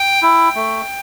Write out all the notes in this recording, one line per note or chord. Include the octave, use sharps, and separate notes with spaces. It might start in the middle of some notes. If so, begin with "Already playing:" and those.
Already playing: G5
E4
A3